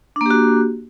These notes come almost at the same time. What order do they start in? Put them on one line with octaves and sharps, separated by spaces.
D4 A#3 G4 F#4